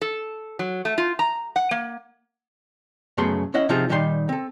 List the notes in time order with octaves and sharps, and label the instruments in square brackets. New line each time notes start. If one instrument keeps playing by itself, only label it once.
[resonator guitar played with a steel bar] A4
F#3
A3
F4
A#5
F#5
A#3
[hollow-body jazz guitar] F#2 C#3 A3 B3 G#4 C6
C#4 E4 D#5 F#5
C3 F3 C4 D#4 F4 G#4
A#2 D#3 G3 D#4 G5 C6
C4 A4